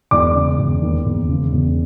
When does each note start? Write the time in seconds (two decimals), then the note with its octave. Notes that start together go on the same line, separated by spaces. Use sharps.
0.11 E1 D5 D6
0.35 C#3
0.58 E1
0.82 D#2
1.05 E1
1.29 C#3
1.52 E1